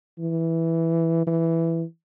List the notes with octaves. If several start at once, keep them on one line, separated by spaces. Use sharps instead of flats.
E3
E3